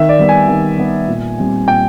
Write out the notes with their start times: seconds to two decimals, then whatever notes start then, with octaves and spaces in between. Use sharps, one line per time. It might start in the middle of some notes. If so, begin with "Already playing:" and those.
Already playing: D#3 E5
0.09 D5
0.19 G3 B3
0.29 G#5
0.48 D#3
0.78 G3 B3
1.08 A#2
1.38 G3 C4
1.67 A#2 G5